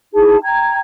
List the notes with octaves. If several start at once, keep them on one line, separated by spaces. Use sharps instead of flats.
D#4 E4 G#4 A5
G5 A#5 G#6